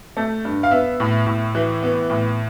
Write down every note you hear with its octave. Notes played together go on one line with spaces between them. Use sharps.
A3
G2
F5
B3 E5
A2
A2
E3
B3
A2